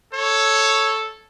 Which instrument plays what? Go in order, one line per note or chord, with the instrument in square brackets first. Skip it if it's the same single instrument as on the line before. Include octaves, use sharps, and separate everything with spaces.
[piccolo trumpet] A4 [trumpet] C#5